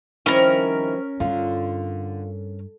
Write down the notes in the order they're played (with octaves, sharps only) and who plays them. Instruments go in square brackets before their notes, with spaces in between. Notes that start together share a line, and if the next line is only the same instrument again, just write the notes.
[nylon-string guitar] D#3 E4 [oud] F3 G3 C4 [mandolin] C#4 A#4
[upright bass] G2 [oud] D3 [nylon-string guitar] F4